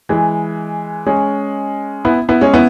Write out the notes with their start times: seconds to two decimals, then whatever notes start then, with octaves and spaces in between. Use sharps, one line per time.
0.09 E3 G#3
1.06 G#3 C#4
2.05 B3 E4
2.29 B3 E4
2.41 G#3 C#4
2.53 B3 E4